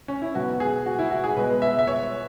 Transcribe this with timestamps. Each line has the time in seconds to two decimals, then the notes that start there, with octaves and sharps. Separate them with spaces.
0.08 C#4
0.22 E4
0.34 B2 F#3 B3 F#4
0.60 G#4
0.86 F#4
0.99 E4
1.11 F#4
1.24 G#4
1.36 B2 G#3 B3 B4
1.62 E5
1.79 E5
1.87 C#5